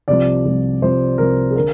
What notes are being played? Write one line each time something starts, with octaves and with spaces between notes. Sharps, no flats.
C2 C3 F3 D5
C2 C3 F3
C2 C3 F3 C5
C2 C3 F3 A#4
G#4
D3 A#4